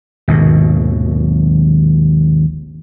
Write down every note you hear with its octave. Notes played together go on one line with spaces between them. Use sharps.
G#1 D#2 B2